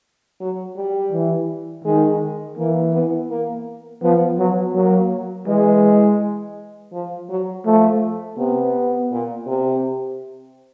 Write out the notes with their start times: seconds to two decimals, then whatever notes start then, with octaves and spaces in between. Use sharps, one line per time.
0.41 F#3
0.76 G3
1.12 E3
1.85 D#3 G#3
2.58 E3 A#3
2.93 B3
3.30 A#3
4.02 F3 B3
4.38 F#3 B3
4.75 F#3 A#3
5.47 E3 G#3
6.92 F3
7.29 F#3
7.65 F3 A3
8.37 C3 B3
9.11 A#2
9.47 C3